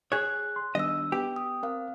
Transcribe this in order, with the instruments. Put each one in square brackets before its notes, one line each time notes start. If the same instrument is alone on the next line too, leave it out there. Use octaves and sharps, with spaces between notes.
[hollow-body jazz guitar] G#4 C#5 [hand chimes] F#6
[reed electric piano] C6
[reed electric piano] D#3 G3 B3 [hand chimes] D4 E6 [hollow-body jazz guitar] D#5
[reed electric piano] B3 [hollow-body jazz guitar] G4
[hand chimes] D#6
[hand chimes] C4 F5 [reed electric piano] A#4